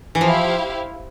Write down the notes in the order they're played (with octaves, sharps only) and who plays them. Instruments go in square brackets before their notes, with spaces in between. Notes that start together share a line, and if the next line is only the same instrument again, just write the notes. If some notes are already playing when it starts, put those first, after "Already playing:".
[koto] E3
[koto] F3 [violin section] E4 G4 C5 F5